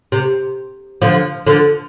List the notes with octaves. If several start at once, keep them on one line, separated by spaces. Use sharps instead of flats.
C3
D3 F3
D3 F3